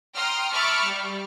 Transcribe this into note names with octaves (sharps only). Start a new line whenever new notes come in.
G5 A#5 C6 D#6 F6
E5 A5 B5 C#6 D6 F6
G3